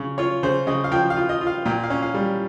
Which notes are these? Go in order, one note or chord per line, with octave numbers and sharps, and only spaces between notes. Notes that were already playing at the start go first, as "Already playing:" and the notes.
Already playing: C#3
F4 C#5
C#3 C5
C#3 D#5
F5
F3 G5
F5
F4
D#5
F4
F5
A#2 G5
F5
C#4
F5
G3